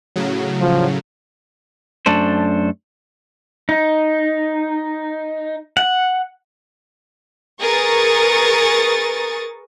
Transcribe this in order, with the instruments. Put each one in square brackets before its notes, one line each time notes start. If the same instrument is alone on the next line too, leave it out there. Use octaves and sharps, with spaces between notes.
[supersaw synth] A2 C#3 F#3
[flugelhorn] F3
[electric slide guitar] F#2 A3 D4 A4 C5
[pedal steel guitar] D#4
F#5
[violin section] G#4 A#4 B4 C#6 D#6 A6